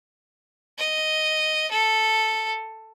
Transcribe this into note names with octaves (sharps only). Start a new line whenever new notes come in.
D#5
A4